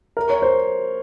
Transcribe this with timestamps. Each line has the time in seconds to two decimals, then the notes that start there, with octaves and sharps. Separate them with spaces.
0.17 A#4
0.30 C#5
0.42 C5